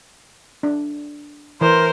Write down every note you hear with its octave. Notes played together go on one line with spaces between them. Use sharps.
D4
E3 A#4 C5